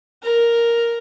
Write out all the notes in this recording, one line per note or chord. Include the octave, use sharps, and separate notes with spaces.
A#4